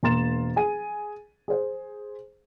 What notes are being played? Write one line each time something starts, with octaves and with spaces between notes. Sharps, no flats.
E1 A#3 A#5 C6 A6 E7
G#4 G#5 D#7
G#4 C5